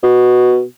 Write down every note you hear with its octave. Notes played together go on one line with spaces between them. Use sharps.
B2